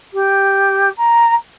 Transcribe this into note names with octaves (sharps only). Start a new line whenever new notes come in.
G4
A#5